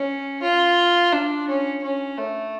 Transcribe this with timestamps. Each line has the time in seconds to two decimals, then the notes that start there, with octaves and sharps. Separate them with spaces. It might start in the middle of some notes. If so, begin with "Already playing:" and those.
Already playing: C#4
0.42 F4
1.13 D4
1.48 C#4
1.83 C#4
2.18 A3